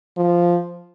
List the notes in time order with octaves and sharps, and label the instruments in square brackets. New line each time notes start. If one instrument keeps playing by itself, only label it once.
[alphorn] F3